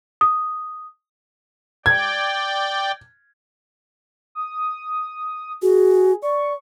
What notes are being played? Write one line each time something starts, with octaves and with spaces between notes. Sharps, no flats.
D#6
D5 G5 G#6
D#6
F#4 G#4
D5 C#6